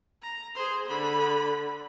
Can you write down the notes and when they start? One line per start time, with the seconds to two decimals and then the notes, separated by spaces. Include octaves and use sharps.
0.22 A#5
0.55 G#4 C5
0.88 D3 B5